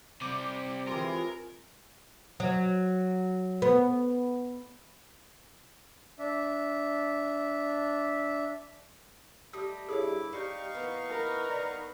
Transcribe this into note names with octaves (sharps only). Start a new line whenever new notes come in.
C3 G3 C4 D6
E3 G#3 F4 G4 A#4
F#3
B3
D4 E5
G3 A3 D#5 D#6
G2 E4 G#4 A4 C#5 D6
G3 C4 D#4 F5 C#6
E3 A#3 B3
A#4 B4
D#3 A#3 B3 D5